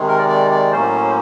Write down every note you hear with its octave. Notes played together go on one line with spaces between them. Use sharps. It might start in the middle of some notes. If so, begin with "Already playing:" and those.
Already playing: C3 D#3 G#3
A#4
D5
D5
D5
A2 F#3 A#3 C#4 C5